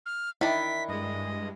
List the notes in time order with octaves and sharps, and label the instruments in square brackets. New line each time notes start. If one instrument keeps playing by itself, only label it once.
[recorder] F6
[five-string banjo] D#3 D4 [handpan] E4 [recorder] B6
[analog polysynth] G2 G#3 [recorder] D#5